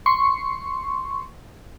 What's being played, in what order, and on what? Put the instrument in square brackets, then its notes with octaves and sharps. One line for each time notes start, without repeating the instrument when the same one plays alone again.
[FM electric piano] C6 C#6